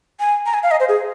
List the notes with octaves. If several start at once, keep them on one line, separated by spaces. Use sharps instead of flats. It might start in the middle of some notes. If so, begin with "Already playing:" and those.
G#5
A#5
G#5
F5
D#5
C5
G#4